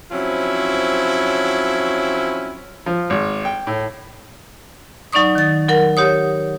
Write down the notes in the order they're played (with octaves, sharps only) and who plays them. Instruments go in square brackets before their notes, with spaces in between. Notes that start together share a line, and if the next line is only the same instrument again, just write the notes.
[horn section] F3 F#3 C4 C#4 E4
[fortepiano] F3
G#1
G5
A2
[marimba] F#3 D#4 D5 C#6 D#6
D#3 A6
F#3 A#4 F#5
G4 C#5 D#6